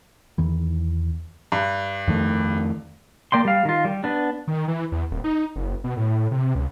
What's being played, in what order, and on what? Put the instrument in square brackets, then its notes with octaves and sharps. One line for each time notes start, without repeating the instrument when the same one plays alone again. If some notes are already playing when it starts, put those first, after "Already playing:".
[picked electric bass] E2 D#3 E3
[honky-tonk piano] G2
[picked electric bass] F2 D#3 A3
[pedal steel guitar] A#3 D5 G5 C6
G3 F5
D#3 F4
G3
B3 D4
[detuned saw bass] D#3
E3
E2
D#1
D#4
F#1
B2
A2
C3
C#2